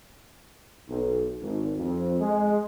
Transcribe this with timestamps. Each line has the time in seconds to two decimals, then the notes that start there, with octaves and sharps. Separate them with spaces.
0.88 B1
1.40 G#1
1.76 F2
2.20 G#3